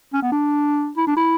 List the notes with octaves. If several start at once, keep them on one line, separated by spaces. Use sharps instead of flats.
C#4
B3
D4
E4
D4
E4